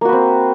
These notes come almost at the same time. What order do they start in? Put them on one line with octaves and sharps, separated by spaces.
A#3 F#4 B4 C4